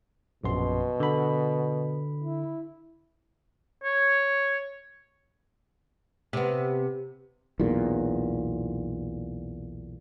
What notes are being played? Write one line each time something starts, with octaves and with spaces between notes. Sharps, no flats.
A#1 F#2 B2 C6
D3 B5
E4
C#5
C3 B3
B1 E2 A#2